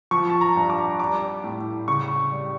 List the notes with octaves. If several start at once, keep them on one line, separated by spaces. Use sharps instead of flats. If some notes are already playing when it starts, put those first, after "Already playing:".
F3 C#6
A5
A#5
G2
D6
G3 D6
A2
C#3 C#6
G3